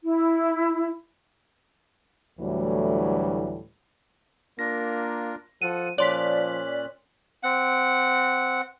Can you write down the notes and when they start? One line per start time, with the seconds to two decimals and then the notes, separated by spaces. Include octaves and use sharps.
0.04 E4
2.40 D2 A2 E3 F#3 G3
4.59 A#3 D4 F4 A#4 A#6
5.62 F3 A4 F#5 D#7
5.98 A#2 F3 C#4 C#5 D5 C6 F#6 B6
7.43 C4 F#5